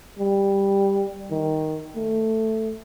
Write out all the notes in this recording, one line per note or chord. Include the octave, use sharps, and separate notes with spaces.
G3
D#3
A3